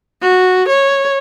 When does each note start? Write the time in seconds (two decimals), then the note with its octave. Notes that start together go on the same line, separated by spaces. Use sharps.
0.22 F#4
0.69 C#5